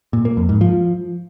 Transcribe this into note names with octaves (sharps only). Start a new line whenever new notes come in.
A#2
A#3
F2
G#2
F3